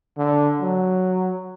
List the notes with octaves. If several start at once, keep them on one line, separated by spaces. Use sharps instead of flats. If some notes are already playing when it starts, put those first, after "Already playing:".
D3
F#3